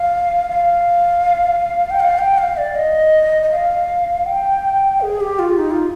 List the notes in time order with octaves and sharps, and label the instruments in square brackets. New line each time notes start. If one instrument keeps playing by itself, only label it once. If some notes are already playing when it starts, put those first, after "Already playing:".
Already playing: [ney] F5
F5
G5
F5
G5
F5
D5
D#5
D#5
F5
G5
G#4
G4
F4
D#4
F4